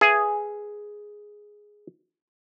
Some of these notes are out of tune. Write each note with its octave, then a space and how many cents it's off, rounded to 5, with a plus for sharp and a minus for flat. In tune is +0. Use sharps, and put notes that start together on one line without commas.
G#4 +0 B4 +0 E5 +30